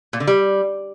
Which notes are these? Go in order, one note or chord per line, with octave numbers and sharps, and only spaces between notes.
A#2
D3
G3